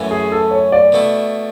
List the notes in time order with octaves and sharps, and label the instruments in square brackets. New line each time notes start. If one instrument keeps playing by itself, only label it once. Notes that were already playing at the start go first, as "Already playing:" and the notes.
Already playing: [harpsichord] F#2 E3 A3 C#4 E4
[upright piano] G#4
A4
C#5
D5
[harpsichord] B2 A3 E4